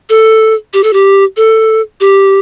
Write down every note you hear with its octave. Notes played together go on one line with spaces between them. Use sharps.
A4
G4
A4
G4
A4
G4